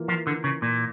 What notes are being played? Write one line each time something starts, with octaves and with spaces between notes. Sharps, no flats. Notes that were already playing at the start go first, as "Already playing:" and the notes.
Already playing: E3 A#3 F4
F3
D3
C#3
A#2